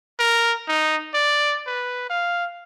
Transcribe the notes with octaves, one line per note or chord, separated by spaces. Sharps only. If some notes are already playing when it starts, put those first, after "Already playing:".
A#4
D#4
D5
B4
F5